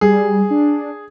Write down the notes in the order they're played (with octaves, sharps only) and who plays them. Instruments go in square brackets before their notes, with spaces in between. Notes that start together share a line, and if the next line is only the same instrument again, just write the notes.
[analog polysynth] G3 [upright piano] G#4
[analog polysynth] D4